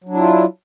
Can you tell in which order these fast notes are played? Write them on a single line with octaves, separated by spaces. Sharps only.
F#3 D4 E4 F4